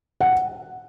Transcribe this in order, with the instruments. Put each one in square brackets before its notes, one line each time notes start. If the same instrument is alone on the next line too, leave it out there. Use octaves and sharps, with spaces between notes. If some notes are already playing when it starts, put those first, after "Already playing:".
[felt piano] F#5